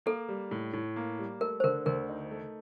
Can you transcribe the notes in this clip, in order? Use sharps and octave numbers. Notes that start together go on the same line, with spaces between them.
A#3 A4
G3
A2
A2
A#3
G3
A3 A#4
C5
D3 A#4
D2 A#4
D#4
A3